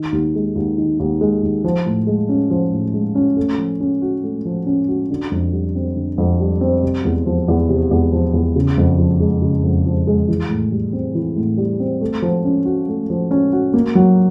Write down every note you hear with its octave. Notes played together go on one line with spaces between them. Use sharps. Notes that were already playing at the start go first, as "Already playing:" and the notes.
Already playing: D#3
D#2
G#3
D#2
D#3
D#2
G#3
D#2
F3
A2
G#3
C#4
F3
A2
G#3
C#4
A3
F3
C#4
F#4
A3
F3
C#4
F#4
D3
F2
G3
C4
D3
F2
G3
C4
C3
E2
F3
E2
C3
E2
F3
E2
C#3
F2
F3
G#3
C#3
F2
F3
G#3
E3
A2
G3
C4
E3
A2
G3
C4
A3
F3
C#4
F#4
A3
F3
C#4
F#4
A#3
F#3